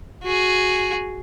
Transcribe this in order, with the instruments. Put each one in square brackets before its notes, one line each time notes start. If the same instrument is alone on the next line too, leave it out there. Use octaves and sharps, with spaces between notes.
[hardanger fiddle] F#4 G#4